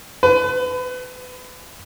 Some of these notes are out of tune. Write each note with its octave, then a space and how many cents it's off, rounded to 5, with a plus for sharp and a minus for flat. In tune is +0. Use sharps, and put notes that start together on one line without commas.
B4 +30